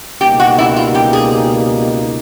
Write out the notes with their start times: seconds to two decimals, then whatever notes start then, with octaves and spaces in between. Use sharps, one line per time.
0.21 C#2 B2 G3 A#3 D#4 G4
0.40 F#4
0.58 E4
0.76 F4
0.95 G4
1.13 G#4